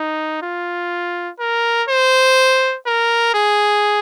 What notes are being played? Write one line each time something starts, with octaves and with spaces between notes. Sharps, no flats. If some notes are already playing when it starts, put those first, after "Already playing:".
Already playing: D#4
F4
A#4
C5
A#4
G#4